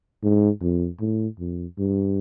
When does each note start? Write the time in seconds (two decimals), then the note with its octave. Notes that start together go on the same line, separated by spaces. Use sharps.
0.23 G#2
0.61 F2
1.00 A2
1.39 F2
1.78 G2